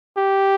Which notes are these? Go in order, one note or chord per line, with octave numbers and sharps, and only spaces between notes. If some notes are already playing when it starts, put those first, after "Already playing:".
G4